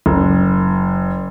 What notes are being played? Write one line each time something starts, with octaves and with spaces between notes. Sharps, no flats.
F#1